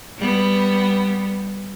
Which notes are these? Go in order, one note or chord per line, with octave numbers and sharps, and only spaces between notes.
G3 B3